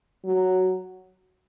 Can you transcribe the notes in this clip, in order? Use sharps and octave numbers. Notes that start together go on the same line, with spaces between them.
F#3